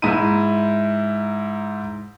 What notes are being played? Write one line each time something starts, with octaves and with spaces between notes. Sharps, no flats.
G#2 E4 E5 A#5 B5 D#7